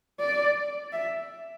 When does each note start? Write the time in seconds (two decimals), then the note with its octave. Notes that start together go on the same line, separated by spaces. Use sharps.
0.20 D5
0.92 E5